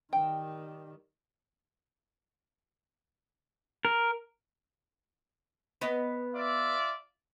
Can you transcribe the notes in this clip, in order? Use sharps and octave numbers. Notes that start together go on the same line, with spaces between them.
D#3 G3 G5
A#4
B3 B4 D#5
F4 D5 E5